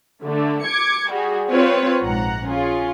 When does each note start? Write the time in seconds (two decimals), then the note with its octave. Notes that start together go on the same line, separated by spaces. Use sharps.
0.23 D3 A3
0.65 D6 G#6 C#7
1.12 G3 F#4 G#4
1.50 C4 F4 B4 C#5
2.02 A#1 G#2 F#5 A#5
2.47 C#4 F4 G#4